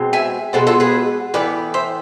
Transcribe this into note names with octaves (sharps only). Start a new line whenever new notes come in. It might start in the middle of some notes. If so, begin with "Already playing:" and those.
Already playing: B2 G#3 C4
E5 G#5
B2 G#3 B3 A4 C5
F4 A4
G#4 B4
A2 E3 B3 B4 D5
C5 E5